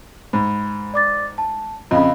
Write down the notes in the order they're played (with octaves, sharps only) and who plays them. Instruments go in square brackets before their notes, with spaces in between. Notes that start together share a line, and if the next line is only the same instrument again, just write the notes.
[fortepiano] G#2 [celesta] B5
[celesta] D5 D6 A6
A5
[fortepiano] F2 C#3 [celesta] D#5 F5 B5